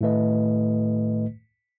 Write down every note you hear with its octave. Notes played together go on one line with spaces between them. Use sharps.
A2 D#3 A3 B4 D#5